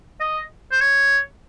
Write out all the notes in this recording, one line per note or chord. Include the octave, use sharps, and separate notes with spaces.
D#5
C5
C#5